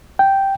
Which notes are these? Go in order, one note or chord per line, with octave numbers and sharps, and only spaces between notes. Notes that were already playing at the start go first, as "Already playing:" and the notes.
G5